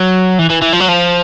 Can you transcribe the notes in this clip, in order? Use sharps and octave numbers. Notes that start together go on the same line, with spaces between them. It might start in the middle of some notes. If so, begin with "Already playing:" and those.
Already playing: F#3
E3
E3
E3
F3
F#3
F3